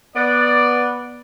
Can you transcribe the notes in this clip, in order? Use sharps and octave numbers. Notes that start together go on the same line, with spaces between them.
B3 D5